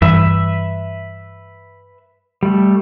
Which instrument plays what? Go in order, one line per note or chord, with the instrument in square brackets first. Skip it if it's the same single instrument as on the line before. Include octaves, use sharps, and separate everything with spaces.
[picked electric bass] G2 E3 [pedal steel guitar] B4 E5
[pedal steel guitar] G3 A3